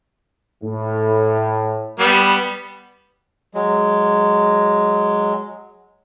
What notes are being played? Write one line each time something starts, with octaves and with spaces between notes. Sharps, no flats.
A2
G3 B3
F#3 G#3